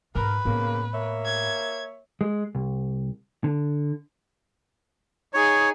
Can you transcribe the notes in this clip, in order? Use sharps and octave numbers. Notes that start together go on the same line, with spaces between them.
G#2 A#4 B4
A2 C#3 A#3 B3
A#3 C#5 E5
G#6
G#3
C2
D3
D#4 G#4 C#5